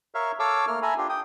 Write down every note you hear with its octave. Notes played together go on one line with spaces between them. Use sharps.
A#4 C#5 E5 F5
A4 C#5 F5 D6 E6
A3 A#3 F6
A4 E5 G#5 A#5 B5
D4 F4 G4
G5 D#6